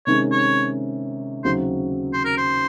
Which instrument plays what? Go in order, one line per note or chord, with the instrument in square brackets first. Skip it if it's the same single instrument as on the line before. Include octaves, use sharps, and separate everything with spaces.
[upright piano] C3 D#3 G#3 C#4 [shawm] C#5
[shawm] C#5
[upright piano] D#2 C#3 F#3 C4 F#4 [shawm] C5
[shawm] C5
A#4
C5